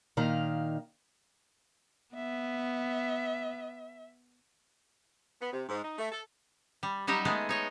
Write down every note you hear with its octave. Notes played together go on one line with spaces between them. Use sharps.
A#2 D#3 F5 A#5
B3 E5
B3
C3
G#2
D#4
A3
A4
G3
F#3 G3 D#4 G4 D#5 E5
G#3 A3 B3 G#4
D#4 C#5 D#5